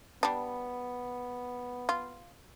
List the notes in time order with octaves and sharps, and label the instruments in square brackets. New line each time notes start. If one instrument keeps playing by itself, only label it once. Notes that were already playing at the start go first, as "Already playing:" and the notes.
[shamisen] G3 D4 [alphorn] B3
[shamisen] F4